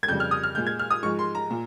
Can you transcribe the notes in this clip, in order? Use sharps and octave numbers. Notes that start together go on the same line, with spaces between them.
G#6
F2 C#3 G3 G6
F6
D#6
F6
A#2 G#3 G6
G#6
F6
D#6
G#2 F3 G#3 C#6
C6
A#5
A#2